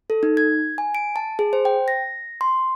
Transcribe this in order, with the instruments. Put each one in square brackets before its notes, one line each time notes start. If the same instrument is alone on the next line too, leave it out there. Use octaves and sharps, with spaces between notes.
[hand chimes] A4
D#4
G#6
G#5
D7
A5
G#4
C5
G5
A#6
C6